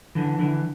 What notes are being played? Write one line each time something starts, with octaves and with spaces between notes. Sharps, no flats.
D3 E3
D3 E3